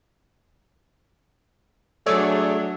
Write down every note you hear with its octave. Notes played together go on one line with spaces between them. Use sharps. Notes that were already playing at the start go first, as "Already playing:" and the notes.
F#3 A3 D4 G#4 C#5 D5